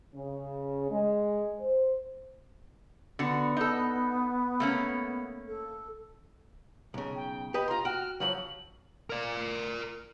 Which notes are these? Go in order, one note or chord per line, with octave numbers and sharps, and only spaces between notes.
C#3
G#3
C5
D3 B3 F#4
D#4 A4
A3 A#3 C#4
A4
B1 C#3
G5
G4 B4 D#5
F4 A#5 C6
F#4 G5 F6
C#3 F3 F#3 F#7
A#4 D5